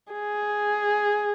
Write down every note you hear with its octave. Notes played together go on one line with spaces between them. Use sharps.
G#4